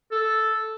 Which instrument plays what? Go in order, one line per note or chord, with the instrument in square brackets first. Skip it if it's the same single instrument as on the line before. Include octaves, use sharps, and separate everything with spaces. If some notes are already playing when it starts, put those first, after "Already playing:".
[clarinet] A4